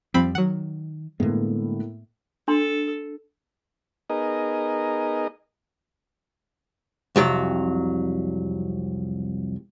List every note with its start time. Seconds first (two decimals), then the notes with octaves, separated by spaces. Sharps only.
0.14 F2 F3 G3 C4 B5
0.35 D#3 F#3 F#5
1.20 A2 D3 G#3 A#3 B3
2.48 D4 A4 C6
4.10 B3 D#4 G#4 A#4 D#5
7.16 C2 F2 F#3